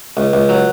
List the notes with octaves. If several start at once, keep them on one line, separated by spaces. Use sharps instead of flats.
C#2
C#2
F#3